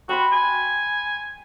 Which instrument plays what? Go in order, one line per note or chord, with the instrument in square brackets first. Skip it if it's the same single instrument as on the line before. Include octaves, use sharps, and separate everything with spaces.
[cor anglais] F#4 [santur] G5 B5 C6
[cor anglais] G#5